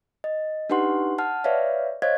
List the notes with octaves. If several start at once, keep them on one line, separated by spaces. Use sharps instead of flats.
D#5
D4 D#4 G4 B4 F#5 C6
F#5 A5 F6
B4 C#5 D5 E5 F5
C5 C#5 D#5 F5 G#6